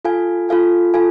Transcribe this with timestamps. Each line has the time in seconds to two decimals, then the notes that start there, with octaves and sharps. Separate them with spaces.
0.05 F4 A4 F5 G#5
0.49 F4 A4 F5 G#5
0.94 F4 A4 F5 G#5